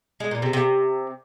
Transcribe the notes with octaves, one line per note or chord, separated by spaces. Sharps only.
G#3
A#2
C3
C3